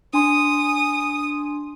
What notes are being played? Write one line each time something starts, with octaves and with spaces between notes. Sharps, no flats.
D4 G#5 C6 D#6